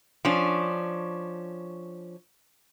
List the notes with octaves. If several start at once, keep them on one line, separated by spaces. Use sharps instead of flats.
F3 C#4 D4